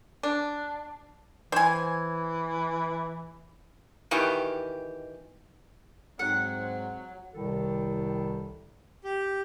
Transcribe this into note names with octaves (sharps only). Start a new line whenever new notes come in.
D4
E3 C5 G#5
B2 D#3 E3 G4
G#2 F#3 C4 F#5
C2 A2 C3 D#3 G3 A4
G4